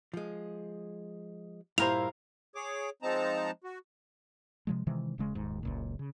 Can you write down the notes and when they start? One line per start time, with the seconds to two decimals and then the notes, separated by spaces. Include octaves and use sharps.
0.14 F3 G#3
1.78 G2 A#2 E4 A#4 C5 F5 F7
2.55 G#4 C#5 D6
3.02 F3 G#3 C4 D#4 A5 A#5
3.64 F#4
4.67 C3 F3 G#3
4.87 C3 D#3 E3 G#3
5.18 E1 C#3 G#3
5.35 D#1 D#2 G#2
5.63 F#1 C#2 A#2
5.99 C#3